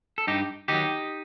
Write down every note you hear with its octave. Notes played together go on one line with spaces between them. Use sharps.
A4
G2 D#4 G4
D#3 F#3 D#4 G4